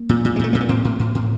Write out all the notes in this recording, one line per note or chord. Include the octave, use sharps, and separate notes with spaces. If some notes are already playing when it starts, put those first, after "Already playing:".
Already playing: A#3
A#2
A#2
G#3
A#2 A3
A#2 A#3
B3
A2 C4
A2
A2
A2